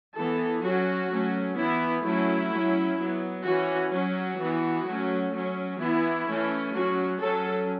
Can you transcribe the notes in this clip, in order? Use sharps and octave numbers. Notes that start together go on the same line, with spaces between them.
E3 B3 A4
F#3 C#4 F#4
F#3 A3 C#4
E3 B3 E4
F#3 A3 C#4 E4
F#3 C#4
F#3 B3
E3 C#4 F#4
F#3 C#4 F#4
E3 B3
F#3 A3 C#4
F#3 C#4
E3 B3 E4
E3 A3 C#4
F#3 C#4 F#4
F#3 C#4 A4